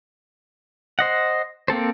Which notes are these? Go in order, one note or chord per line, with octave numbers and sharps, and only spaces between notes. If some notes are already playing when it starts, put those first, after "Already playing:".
C5 D#5 F#5
A#3 C4 A4 C5